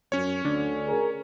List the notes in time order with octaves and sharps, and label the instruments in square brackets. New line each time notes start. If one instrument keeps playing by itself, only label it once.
[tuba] F#2 [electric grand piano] C#4 C#5
[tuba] D2 [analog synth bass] D3
[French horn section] G#4 A#4